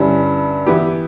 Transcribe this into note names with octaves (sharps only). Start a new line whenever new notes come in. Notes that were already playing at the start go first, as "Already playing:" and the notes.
Already playing: G2 D3 G3 C#4 E4
E3 B3 E4 G4